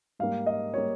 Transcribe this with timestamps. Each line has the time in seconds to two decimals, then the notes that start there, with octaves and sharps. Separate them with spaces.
0.19 G#2 G3 A#3 F5
0.46 D#5
0.74 G3 A#3 C#5